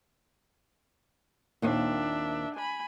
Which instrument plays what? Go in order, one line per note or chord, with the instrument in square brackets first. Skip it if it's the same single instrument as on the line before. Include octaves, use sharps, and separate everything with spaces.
[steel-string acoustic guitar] D#2 A#2 C4 [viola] D4 E5
[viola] G#5 B5